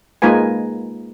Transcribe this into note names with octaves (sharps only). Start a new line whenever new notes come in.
G#3 A#3 D#4 F4 B4 G#5